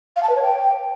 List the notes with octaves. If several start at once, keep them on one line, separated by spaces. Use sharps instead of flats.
F5
A5
B4
C#5
G5